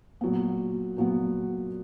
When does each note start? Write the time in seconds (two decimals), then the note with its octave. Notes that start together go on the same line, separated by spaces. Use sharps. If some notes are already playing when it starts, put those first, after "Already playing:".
0.21 A#2 F#3 B3
0.96 A#2 F#3 B3